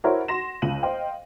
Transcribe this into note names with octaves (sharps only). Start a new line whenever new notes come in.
E4 F#4 A#4 C5 C#5
F#4 C6 A#6 E7
C#2 D#7 F#7
C5 D#5 F5 G5